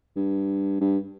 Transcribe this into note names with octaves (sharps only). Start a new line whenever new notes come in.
G2
G2